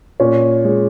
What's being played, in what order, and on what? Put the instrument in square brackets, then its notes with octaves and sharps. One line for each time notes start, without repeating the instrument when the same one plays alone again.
[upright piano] A#2 C#4
G#3